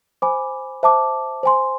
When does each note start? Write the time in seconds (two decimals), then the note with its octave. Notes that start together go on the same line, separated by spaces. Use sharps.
0.22 C5 G#5 B5 D6
0.83 C5 E5 A5 D6
1.43 C5 G#5 C6